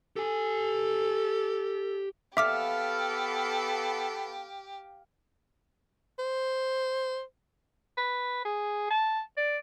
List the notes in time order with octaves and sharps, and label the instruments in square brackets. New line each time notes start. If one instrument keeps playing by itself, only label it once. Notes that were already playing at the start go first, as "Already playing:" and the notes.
[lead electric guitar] G4 G#5 [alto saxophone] A4
[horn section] B3 A4 B5 [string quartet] G4 [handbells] E5 D6 B6 [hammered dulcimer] F5
[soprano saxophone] C5
B4
G#4
A5
D5